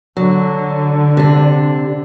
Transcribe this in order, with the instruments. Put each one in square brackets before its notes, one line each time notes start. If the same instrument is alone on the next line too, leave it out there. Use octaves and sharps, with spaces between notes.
[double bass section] D3 [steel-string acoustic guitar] F#3
[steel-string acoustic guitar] C3 D4